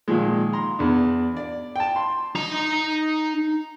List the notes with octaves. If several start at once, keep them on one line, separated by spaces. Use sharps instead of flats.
A#2 D#3 F3 G#3
A#5 C6
E2 D4
D5
G5 A5
C6
D#4 A#5